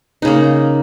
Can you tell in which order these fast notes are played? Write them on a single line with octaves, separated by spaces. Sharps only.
D#4 C#3 A#3